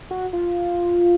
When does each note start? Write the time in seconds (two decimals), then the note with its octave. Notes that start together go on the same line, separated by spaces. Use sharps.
0.11 F#4
0.33 F4